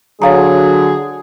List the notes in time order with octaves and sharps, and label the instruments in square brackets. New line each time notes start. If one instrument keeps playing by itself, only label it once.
[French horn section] D3 F#3 [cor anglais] G#4 [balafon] C#5 F5 A#5